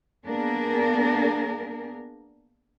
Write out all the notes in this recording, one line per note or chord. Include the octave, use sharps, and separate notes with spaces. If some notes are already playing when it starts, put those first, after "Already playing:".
A#3 B3 D4 G#4 A#4